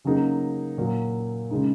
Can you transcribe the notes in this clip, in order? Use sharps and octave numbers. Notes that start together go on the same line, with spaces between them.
C#3 F#3 A#3 D#4 G#4
A#2 F#3 A#3
C#3 G#3 D#4